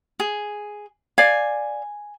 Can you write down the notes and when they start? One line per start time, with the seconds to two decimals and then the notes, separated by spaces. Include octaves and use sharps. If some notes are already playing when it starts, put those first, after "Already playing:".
0.20 G#4
1.18 D5 F5 G#5